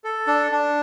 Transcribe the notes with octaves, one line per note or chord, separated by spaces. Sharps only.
A4
D4
D4